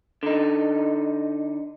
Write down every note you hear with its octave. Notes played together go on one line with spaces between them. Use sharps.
D3 D#4